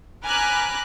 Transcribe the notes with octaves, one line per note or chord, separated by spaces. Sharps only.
G#5 A#5 B5 D6 F6 F#6